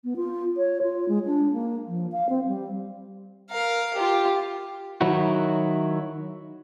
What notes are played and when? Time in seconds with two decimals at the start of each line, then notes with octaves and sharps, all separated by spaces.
0.04 B3
0.16 F4
0.57 C#5
0.82 F4
1.08 G#3
1.26 D4
1.53 A#3
1.87 F3
2.12 F5
2.29 C4
2.47 G3
3.50 A#4 F5
3.94 F4 G4
5.01 D#3 F#3 E4 F#4